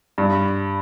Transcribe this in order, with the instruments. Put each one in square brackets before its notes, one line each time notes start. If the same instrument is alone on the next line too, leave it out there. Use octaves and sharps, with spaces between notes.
[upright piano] G2